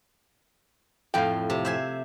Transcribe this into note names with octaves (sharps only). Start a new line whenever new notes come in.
F2 A2 F5 G5
C3
C5 E5 G#5